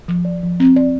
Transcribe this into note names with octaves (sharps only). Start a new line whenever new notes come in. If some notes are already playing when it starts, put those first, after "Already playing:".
F3
D5
F3
C4
D5